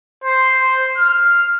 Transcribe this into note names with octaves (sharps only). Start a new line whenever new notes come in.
C5
F6